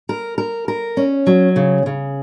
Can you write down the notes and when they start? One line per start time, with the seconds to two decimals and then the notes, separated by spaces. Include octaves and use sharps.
0.09 A#4
0.38 A#4
0.68 A#4
0.97 C#4
1.27 F#3
1.56 C#3
1.86 C#3